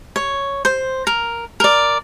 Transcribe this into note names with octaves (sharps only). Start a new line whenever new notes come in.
C#5
C5
A#4
A#4 D5